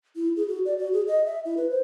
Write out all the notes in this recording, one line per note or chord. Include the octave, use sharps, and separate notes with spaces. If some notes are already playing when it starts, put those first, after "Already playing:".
E4
G#4
F#4
D5
F#4
G#4
D#5
E5
E4
B4
C5